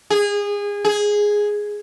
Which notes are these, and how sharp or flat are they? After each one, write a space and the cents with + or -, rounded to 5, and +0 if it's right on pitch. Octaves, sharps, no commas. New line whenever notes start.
G#4 -25
G#4 +0